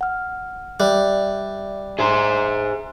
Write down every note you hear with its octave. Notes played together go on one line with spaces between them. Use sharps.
F#5 F6
G3 D5 E5 F#6
G#4 C5 E5 A#5 C6